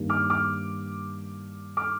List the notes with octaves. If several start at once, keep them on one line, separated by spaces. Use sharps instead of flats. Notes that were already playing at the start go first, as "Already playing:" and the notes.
Already playing: G2 D#3 A#3
D6 F6
D6 F6
D6 F6